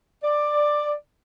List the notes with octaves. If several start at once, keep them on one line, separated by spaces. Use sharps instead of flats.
D5